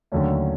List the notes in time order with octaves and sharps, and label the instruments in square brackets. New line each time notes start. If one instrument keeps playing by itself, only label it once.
[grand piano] D#2 D3 F#3 A3 C#4